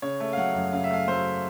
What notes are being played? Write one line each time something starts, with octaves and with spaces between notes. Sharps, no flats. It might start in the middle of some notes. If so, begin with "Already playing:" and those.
C#3 C#5
A3
F5
F#3 F#5
F#2
C#3 F5
E5
A3 F5
F#3 C5